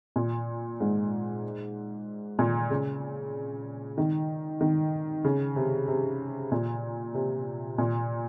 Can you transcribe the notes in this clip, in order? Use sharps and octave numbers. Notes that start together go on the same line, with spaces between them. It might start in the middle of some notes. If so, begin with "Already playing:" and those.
A#2
G#2
A#2
C#3
D#3
D#3
C#3
C3
C3
A#2
C3
A#2